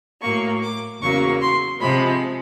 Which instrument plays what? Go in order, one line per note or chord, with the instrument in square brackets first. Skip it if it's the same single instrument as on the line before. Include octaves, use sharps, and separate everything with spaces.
[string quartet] A2 F#3 A#3 C#6
D6
E2 C#3 F#3 A#3 C#6
C6
C3 F3 G#3 B5